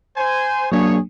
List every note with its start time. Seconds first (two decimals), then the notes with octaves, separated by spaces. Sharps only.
0.17 C5 G#5
0.72 F#3 A#3 D4 G#4 C#5